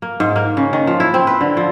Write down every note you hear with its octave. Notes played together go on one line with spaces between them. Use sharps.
A#3
G#2
A#3
C#3
D#3
F3
E4
C4
B4
D3
F3